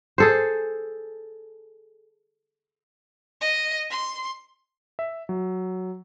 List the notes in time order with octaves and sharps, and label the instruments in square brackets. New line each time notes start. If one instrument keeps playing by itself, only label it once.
[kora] G#4 A4 C5
[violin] D#5
C6
[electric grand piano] E5
F#3